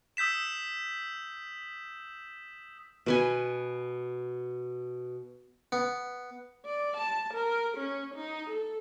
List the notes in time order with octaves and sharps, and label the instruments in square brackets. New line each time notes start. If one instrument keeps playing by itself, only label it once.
[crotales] D#6 E6 G6 B6 E7
[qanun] B2 B4 G#5
[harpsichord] B3
[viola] D5
A5
A#4
C#4
D#4
A4